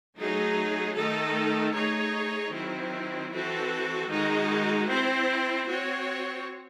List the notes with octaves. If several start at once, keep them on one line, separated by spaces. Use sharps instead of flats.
F#3 A3 D#4 G#4
D#3 A3 D#4 A4
A3 D#4 G#4 C#5
D#3 F#3 C4 E4
E3 C4 F#4 A4
D#3 G#3 D#4 F#4
C4 E4 C5
C4 F#4 C#5